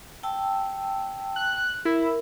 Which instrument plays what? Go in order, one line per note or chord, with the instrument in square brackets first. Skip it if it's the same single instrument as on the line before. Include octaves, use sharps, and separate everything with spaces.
[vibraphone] G5 A5 E6
[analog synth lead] F#6
[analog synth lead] E4 [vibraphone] A#4